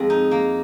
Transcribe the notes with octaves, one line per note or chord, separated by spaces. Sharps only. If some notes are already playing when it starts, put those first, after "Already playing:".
Already playing: F2 G#3 A#5
D#4
A#3